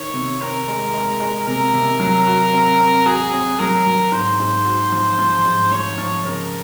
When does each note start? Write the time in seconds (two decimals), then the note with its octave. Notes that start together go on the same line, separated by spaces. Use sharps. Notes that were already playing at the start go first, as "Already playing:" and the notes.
Already playing: D#3 C#5
0.14 C3
0.41 C4 A#4
0.68 G#3
0.94 G#3
1.20 G#3
1.47 C3 A#4
1.74 C3
2.00 F#3
2.27 F#4
2.54 C4
2.80 C4
3.06 F#4 G#4
3.33 C4
3.59 F#3 A#4
3.86 F#3
4.12 G#2 C5
4.40 G#2
4.65 F#4
4.92 F3
5.19 F3
5.45 G#2
5.71 F3 C#5
5.98 F3
6.25 C#3 A#4